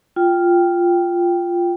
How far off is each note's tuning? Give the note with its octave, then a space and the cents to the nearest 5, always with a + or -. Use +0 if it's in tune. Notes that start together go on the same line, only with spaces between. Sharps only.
F4 +0 G5 +0